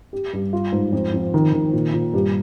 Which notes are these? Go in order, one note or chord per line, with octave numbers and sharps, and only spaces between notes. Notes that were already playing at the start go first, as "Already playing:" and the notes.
G4
G2
F4
G#2
F2
F2
D#3
D#3
A#2
A#2
G2